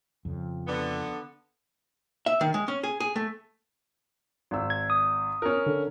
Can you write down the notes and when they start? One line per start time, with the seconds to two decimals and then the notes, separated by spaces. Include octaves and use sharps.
0.25 F2 C#3
0.67 D3 B3
2.26 E5
2.41 D#3
2.54 G#3
2.68 C#4
2.83 G#4
3.00 G#4
3.16 A3
4.51 G#1 E6
4.70 G#6
4.90 D#6
5.42 C#4 A#4
5.66 D3